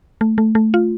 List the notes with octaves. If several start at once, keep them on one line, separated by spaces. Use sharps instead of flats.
A3
A3
A3
F4